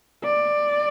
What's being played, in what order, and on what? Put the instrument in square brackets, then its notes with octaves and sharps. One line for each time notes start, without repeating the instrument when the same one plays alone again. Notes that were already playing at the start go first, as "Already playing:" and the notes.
[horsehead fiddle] D5